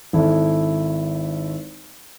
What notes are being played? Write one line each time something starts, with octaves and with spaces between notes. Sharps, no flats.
G#1 E4 A4